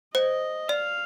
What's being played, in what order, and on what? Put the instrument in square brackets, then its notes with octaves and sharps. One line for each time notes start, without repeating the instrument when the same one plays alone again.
[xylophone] C5 [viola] D#5
[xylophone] D5 [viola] F5